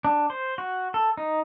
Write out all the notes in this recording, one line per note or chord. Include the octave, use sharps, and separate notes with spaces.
D4
C5
F#4
A4
D#4